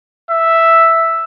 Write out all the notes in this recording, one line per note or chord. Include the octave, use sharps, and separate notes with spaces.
E5